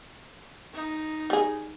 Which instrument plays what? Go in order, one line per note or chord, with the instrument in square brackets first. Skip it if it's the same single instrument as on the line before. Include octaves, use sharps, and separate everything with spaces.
[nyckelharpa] D#4
[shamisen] G3 G#4